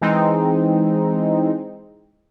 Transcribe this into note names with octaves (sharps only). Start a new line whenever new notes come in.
E3 G#3 C4 D#4